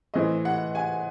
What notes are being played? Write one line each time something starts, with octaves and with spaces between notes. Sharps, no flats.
A2 E3 C4 D#5
F#5
G#5